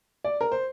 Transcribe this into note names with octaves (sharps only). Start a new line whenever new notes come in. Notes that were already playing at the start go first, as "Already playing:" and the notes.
D5
A#4
C5